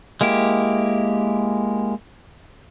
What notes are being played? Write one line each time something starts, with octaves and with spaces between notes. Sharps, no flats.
G#3 A#3 E4 G4